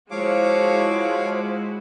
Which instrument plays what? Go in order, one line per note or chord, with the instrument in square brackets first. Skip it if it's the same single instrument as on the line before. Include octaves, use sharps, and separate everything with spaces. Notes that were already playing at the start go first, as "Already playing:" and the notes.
[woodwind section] F3 [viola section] G#3 E4 F#4 [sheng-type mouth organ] C#5 F5 D6